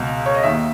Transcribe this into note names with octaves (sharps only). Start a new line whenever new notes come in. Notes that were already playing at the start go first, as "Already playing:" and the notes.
Already playing: C#2 B2
C#5
D#5
D#2 D#3 E5